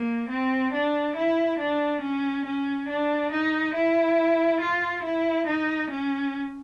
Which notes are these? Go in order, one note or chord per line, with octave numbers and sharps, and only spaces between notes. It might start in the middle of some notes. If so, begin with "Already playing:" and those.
Already playing: A#3
C4
D4
E4
D4
C#4
C#4
D4
D#4
E4
F4
E4
D#4
C#4